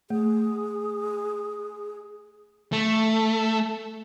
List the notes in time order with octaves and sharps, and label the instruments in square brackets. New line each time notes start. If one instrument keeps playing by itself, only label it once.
[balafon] A3 [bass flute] G#4
[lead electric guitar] A3